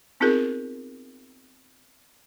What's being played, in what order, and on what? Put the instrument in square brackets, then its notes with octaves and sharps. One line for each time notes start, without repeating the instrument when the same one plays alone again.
[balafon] B3 C4 D#4 F4 G#4 A#4